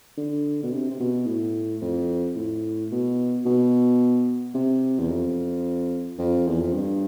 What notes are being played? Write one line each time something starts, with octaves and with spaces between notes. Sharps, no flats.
D3
B2
C3
C3
B2
A2
F2
A2
B2
B2
C3
E2
F2
F2
E2
F2
G2